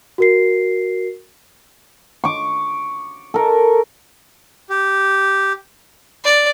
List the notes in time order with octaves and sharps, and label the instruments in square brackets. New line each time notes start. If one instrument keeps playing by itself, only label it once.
[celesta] F#4 A#4 C7
[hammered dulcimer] C#6 D6
A4 A#4
[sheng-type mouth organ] G4
[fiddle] D5